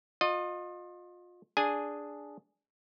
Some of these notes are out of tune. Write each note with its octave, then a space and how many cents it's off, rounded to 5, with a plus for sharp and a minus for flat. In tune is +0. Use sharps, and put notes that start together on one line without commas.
F4 +30 D#5 -15
D4 +0 G#4 +0 G#5 -5